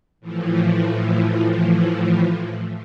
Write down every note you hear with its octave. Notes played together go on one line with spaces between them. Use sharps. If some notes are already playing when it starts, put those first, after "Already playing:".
A2 E3 F3